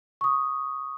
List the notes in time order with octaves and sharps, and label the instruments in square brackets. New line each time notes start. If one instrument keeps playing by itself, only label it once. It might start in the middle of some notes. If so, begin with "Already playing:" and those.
[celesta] C#6 D#6